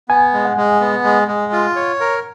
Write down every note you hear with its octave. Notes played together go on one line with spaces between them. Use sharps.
B3 G#5
G#3
F#5
G#3
B3
G#3
G#3
F4
C#5
A#4